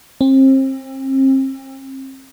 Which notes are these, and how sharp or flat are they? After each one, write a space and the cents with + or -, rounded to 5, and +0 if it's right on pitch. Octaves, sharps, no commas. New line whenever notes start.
C4 +35